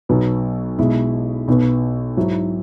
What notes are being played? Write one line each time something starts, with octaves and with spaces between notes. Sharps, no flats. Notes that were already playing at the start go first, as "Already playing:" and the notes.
B1 B2 F#3 B3
B1 B2 G#3 E4
B1 B2 B3
G#2 F#3 E4